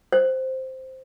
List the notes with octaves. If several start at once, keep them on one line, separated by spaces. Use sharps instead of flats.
C5